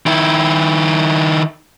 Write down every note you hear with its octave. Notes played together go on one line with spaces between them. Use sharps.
D#3 E4